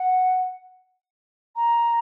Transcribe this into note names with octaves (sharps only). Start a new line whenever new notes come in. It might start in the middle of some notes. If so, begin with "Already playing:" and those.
Already playing: F#5
A#5